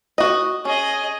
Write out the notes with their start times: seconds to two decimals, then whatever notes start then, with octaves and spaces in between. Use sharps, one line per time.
0.18 F#4 D#5
0.65 C#4 G#4 D#5